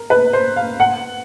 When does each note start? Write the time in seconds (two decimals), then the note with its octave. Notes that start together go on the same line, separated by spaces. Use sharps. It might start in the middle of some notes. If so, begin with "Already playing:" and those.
Already playing: A#4
0.10 B4
0.33 C5
0.56 F5
0.80 F#5